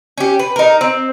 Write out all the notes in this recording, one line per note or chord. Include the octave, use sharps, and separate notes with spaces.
C#4 G4
B4
D#4 A#4
C4